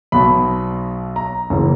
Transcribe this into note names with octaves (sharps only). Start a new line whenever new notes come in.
B1 B2 B5
A#5
F#1 C#3 E3